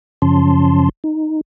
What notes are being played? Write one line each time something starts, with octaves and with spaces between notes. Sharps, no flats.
F#2 C#3 F3 C#4 A5 C6
D#4